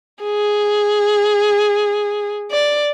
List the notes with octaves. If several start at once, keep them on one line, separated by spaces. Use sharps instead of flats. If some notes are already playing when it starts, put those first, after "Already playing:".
G#4
D5